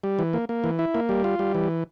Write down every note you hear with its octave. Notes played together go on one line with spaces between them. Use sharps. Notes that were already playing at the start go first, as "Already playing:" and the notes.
G3
E3
A#3
A#3
E3
E4
A#3
G3
F4
G3
E3